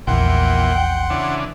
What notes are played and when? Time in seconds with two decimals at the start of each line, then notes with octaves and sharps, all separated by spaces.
0.07 A#1 E2 A#2 E3 F#5 G5 C6
1.10 C#3 E3 D4